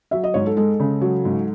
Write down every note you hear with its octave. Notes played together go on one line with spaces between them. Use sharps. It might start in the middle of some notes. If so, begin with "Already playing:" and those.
F#3 E5
D#5
G#2 C#5
A4
G#3 A4
C#3
F#3
G#2